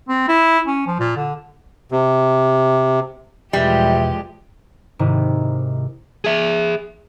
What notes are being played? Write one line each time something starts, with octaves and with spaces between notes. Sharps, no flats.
C4
E4
C#4
F3
A#2
D3
C3
E2 B2 F3 G3 G#3 G4 B4 E5
G#2 C3 D#3 E4
G#4 E5